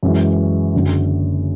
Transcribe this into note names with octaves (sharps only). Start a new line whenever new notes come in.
F#2 E3 G#3
F#1 F#2 D3 F#3